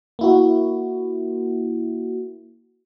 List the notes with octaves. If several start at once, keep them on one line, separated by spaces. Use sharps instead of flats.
A#3 E4 F#4